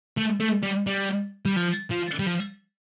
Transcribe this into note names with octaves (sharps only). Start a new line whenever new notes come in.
A3
A3
G3
G3
G3
F3
F3
G3
F3